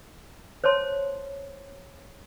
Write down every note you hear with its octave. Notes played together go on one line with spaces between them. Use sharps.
C5 C#5 A5 C6